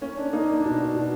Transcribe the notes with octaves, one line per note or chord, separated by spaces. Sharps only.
A#3 C#4
D4
A#3 D#4
D4
B2 D4
B2